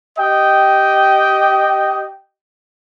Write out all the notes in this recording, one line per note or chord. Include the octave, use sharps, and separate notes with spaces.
G4 D#5 G5